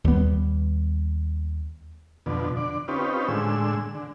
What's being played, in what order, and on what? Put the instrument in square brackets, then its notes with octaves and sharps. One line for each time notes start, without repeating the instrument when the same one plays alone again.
[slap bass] D#2 G3 B3
[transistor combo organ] F2 B2 D3
D3 D5
C4 C#4 D#4 F4 G4 B4
A2 D3 G#3 E6
D3